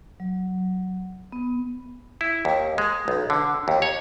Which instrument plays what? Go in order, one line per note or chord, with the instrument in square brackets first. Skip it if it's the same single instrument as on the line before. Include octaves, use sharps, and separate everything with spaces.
[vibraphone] F#3
B3
[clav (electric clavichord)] E4
D#2
G#3
B1
D3
D#2
C#5